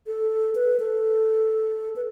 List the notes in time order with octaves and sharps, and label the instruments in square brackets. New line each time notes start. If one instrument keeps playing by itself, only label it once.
[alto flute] A4
B4
A4
B4